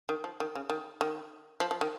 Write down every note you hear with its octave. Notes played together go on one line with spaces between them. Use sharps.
D#3
F3
D#3
C#3
D#3
D#3
F3
F3
D#3